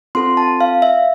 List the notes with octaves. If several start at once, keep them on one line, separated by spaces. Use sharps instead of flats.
C4 F4 A4 C6
A5
F5
E5